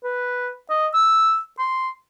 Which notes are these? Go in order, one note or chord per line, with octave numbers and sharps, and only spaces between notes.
B4
D#5
E6
C6